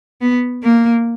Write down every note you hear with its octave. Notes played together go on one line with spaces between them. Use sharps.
B3
A#3